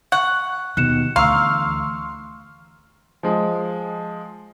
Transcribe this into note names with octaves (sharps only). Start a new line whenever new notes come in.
F#5 C#6 F#6
D#2 B2 F#6 C#7 E7
D2 E3 F5 A#5 C6 C#6 E6 F6
F3 G#3